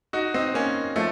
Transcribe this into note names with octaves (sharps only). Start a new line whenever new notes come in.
D#4 F#4
C4 D#4
A#3 C#4
F3 A3